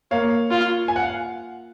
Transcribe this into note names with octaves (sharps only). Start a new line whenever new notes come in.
A#3 C#5 F5
F4
G#5
F#5
F5